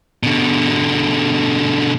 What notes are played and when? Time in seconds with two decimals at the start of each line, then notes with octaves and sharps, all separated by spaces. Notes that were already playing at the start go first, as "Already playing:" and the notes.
0.23 B2 D3